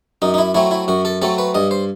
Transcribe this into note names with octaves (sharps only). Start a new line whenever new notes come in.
F#2 D#4
D#4
E4
F#3 A3 C4 E4
E4
F#2 F#4
A4
F#3 A3 C4 A4
B4
G2 D#5
C5